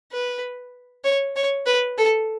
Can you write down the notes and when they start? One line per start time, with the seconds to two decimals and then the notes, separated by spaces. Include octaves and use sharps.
0.12 B4
1.04 C#5
1.36 C#5
1.66 B4
1.98 A4